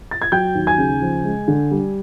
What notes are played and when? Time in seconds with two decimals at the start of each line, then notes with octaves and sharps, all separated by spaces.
0.11 A6
0.22 G#6
0.32 F#3 G5 G6
0.55 D#2
0.67 G#5 G#6
0.78 C#3
1.02 F3
1.24 G#3
1.48 D3
1.71 G3